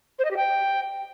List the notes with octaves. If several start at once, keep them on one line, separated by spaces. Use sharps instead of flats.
C5
D#5
G4
G5